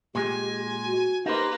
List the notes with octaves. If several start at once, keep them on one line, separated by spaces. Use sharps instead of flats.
A#2 G#3 G4 G#5
F#4
A#3 D#4 G4 B4 C5